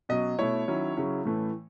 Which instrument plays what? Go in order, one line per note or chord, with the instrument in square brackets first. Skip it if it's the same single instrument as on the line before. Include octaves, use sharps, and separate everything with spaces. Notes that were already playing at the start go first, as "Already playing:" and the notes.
[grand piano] B2 F#3 C#4 D#5
B2 A3 E4 C#5
D#3 F#3 C#4 E4
C#3 F#3 C#4 E4
A2 E3 A3 C#4